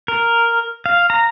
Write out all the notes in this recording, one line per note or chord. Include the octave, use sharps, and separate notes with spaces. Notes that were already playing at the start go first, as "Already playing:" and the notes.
A#4
F5
A#5